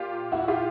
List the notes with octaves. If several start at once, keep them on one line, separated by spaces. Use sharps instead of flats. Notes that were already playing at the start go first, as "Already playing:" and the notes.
Already playing: A#2 F4 G4
E4 F#4
F4 G4